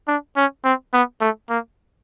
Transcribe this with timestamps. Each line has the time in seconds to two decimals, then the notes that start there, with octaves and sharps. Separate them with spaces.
0.08 D4
0.37 C#4
0.65 C4
0.93 B3
1.21 A3
1.50 A#3